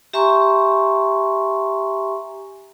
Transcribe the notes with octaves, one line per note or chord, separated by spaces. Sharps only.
G4 E5 G#5 A#5 C6 C#6